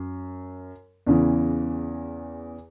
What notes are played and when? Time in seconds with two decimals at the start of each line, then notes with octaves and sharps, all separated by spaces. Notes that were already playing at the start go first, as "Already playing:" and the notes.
Already playing: F#2
1.06 E2 C#3 E3